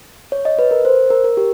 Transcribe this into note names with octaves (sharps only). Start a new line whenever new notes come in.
C#5
D#5
B4
A#4
C5
A#4
A#4
G4